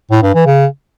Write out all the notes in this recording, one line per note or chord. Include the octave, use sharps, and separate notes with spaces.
A2
G2
E3
C#3